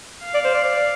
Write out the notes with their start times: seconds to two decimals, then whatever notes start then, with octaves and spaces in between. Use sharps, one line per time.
0.24 F5
0.34 D5
0.45 C5
0.55 D5
0.65 D5